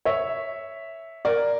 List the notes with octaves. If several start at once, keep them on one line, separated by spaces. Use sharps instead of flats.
C#5 E5
A#4 D5